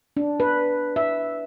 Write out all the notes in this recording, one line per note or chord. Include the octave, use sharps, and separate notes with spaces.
D4
B4
E5